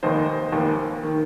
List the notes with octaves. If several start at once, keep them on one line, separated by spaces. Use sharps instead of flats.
F1 D#2 D#3 C5 D#5
F1 D#2 D#3
D#3